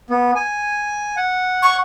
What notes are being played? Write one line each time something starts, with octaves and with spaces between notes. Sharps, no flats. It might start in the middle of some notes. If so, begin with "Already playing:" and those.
B3
G#5
F#5
C#6